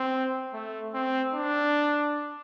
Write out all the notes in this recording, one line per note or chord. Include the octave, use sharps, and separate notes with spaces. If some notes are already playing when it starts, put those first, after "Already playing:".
Already playing: C4
A3
C4
D4